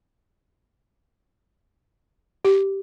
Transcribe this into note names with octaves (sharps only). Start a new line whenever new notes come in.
G4